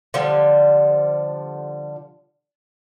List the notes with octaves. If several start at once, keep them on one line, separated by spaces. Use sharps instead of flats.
D3 F3 G3